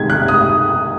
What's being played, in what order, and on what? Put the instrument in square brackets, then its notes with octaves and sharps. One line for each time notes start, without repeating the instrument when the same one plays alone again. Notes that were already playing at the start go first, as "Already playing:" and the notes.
Already playing: [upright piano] C3 D#3 G#3 G#6
F#6
D#6